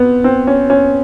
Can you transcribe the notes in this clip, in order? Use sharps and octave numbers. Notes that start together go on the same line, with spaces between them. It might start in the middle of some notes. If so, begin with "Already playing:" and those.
Already playing: B3 C4
C4
C#4
C#4